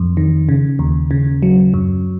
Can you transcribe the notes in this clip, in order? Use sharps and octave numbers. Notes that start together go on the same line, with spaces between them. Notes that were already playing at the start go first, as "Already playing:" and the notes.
Already playing: F2
D#3
C#3
D#2
C#3
F#3
F#2